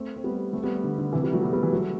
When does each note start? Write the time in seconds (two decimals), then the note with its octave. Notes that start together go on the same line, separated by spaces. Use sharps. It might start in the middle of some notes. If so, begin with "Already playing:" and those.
Already playing: A3 C4
0.16 C4
0.24 G3 B3
0.53 A3 C4
0.63 G3 B3
0.84 D3
0.98 D3
1.13 C3 E3
1.23 E3 G3
1.33 F#3 A3
1.43 G3 B3
1.53 G3 B3
1.63 E3 G3
1.73 F#3 A3